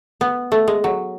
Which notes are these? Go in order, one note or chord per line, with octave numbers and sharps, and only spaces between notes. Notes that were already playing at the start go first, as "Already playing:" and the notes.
B3
A3
G#3
F#3